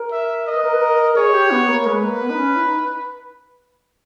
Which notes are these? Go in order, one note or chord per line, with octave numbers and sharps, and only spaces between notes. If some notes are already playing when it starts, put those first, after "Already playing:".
Already playing: A#4
E5
D#5
B4
A#4
B4
A#4
G#4 C#5
G4
B3
A#3
G#3 B4
A#3
B3
D#4
C#4
E4
D#4